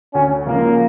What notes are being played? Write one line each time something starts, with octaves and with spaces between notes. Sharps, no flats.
D2 C#4
C#3 F3 G#3 A#3